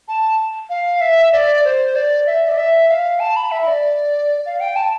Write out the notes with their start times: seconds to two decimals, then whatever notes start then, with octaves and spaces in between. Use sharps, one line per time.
0.08 A5
0.70 F5
1.01 E5
1.32 D5
1.64 C5
1.96 D5
2.26 E5
2.49 D5
2.58 E5
2.89 F5
3.20 A5
3.36 B5
3.51 E5
3.67 D5
4.46 F5
4.60 G5
4.76 A5